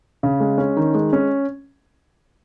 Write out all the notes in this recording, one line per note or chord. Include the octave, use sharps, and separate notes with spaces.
C#3
G#3
C#4
D#3
G#3
C#4